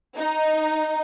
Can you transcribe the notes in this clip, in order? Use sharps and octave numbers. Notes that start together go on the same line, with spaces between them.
D#4